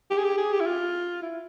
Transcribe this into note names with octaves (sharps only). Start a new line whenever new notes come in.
G4
G#4
G4
G#4
G4
E4
F4
E4